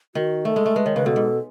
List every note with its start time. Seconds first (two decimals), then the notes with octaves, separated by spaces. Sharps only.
0.15 D#3 F#4
0.45 A3 A4
0.56 G#3
0.66 A3
0.76 G#3 B4
0.86 D#3 C#5
0.96 C#3 B4
1.06 B2 A4
1.16 G#2